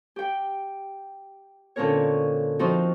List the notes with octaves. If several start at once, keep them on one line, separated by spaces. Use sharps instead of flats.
G4 G5
A#2 D3 C4 C#4 A#4 C#5
F3 C4 D#4 F4 F#4